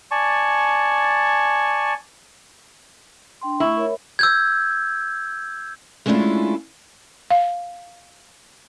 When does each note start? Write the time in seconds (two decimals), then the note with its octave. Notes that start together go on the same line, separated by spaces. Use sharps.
0.11 D5 G#5 A5 C#6
3.41 D4 G5 C6
3.60 A3 E4 C#6
3.77 A#4 C#5 E5
4.19 E6 G6 G#6
6.06 G#3 A3 C#4 D4 E4 F4
7.31 F5